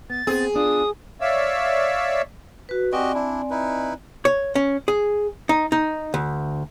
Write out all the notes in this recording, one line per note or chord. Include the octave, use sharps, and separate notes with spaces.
B3 A6
B3 C4 G#4
B3 D4 F4 D#6
C#5 D5 E5 F5 E6
F#4 B4
C4 F#4 G4 D5 D#5 G#5
D4 E4
D#4 E4 B4
C#5
C#4
G#4
D#4
D#4
D2